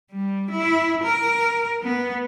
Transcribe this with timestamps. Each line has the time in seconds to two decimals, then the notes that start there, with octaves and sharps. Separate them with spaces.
0.12 G3
0.51 E4
1.04 A#4
1.82 B3